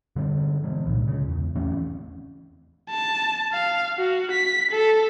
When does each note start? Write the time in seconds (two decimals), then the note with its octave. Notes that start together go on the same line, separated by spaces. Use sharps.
0.16 D3 G3 C4
0.64 E3 G#3
0.86 C2 A#2
1.08 C#3 G#3
1.28 E2
1.56 E3 A3 C4 C#4
2.90 A5
3.53 F5
3.98 F#4
4.31 B6
4.71 A4